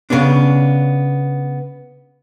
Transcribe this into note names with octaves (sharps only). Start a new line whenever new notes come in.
C#3 A#3 B3 C#4 D4